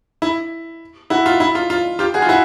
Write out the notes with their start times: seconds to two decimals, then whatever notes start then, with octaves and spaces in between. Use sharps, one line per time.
0.22 E4
1.10 E4 F#4
1.26 F4
1.40 E4
1.55 F4
1.70 F4
1.99 F4 G4
2.14 F#4 G#4
2.22 F4
2.29 E4 F#4